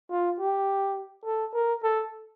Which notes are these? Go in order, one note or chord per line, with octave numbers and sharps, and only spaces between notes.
F4
G4
A4
A#4
A4